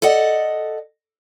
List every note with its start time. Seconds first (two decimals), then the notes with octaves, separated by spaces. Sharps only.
0.02 A4 D5 D#5 F#5